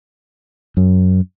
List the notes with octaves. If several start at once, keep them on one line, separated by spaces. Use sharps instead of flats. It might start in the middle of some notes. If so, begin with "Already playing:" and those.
F#2